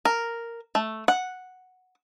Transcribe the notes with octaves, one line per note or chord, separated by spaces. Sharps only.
A#4
A3
F#5